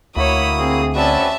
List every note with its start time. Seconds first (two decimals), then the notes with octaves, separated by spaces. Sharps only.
0.16 D2 A#3 E4 F#4 C#5 B5 D#6
0.58 C4 G#4
0.95 C4 C#4 F#4 B4 D5 E5 A5